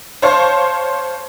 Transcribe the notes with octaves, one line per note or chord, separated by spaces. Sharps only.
C5 C#5 F5 A5 C6